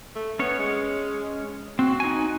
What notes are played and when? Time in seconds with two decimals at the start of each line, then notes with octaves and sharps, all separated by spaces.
0.16 A3
0.39 B3 C#4 C#5
0.59 G#3
1.79 C4 F#4
2.00 D#4 G#5